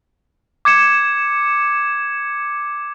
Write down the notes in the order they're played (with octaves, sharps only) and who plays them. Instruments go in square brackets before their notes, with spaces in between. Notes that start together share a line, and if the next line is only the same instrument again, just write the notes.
[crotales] D6 G#6 C#7 E7